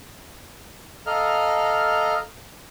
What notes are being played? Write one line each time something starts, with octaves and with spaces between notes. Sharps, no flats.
A4 D#5 F5 A#5 F6